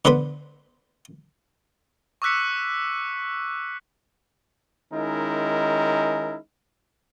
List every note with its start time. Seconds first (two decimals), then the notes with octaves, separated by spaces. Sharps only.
0.05 D3 B3 B4 C5 B5
2.22 C#6 D6 E6 F#6 B6 C#7
4.93 D#3 G#3 C#4 D#4 E4 A#4